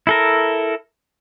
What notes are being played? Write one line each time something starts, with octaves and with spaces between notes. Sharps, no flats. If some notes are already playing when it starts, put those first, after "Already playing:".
E4 A4 A#4